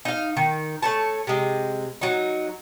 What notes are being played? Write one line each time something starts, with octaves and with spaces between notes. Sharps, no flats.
D#4 F5
D#3
A3 C#5 A5
C3 G#3
F#3 D#4